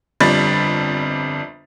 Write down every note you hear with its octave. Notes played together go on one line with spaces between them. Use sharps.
G1 F2 G3 B5 A6